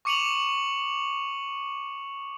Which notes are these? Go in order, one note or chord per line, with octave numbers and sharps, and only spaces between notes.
C#6 D6 C#7 D#7 F7 F#7